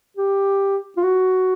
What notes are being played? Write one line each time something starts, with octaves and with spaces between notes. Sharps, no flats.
G4
F4
F#4